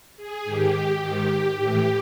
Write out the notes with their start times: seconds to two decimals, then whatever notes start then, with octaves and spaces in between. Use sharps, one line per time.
0.17 G#4
0.44 G#2 D#3 G4
1.01 G#2 D#3
1.57 A2 E3 G4